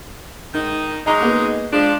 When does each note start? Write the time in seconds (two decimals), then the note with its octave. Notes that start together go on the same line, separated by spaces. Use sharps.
0.54 G#2 D#3 D#4
1.07 F#3 G#3 D#4 A#5 D6 A#6
1.21 A#3 B3 G#4
1.73 F3 G#3 D4